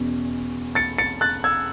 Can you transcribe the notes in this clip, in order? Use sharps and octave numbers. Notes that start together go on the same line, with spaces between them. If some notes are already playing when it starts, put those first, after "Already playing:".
Already playing: E2 B2 C#4
A6 C#7
A6 C#7
F#6 A6
E6 G#6